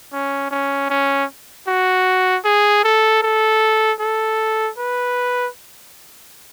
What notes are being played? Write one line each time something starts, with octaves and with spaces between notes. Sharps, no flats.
C#4
C#4
C#4
F#4
G#4
A4
A4
A4
B4